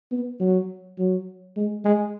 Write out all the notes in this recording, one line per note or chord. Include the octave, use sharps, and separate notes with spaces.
B3
F#3
F#3
G#3
G#3